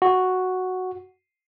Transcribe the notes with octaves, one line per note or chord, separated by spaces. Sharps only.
F#4